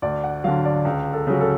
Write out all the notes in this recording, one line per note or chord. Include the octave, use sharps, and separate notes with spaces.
D2 D5
F#5
D3 F#3 F5
D5
C#2
A4
C#3 F#3
A4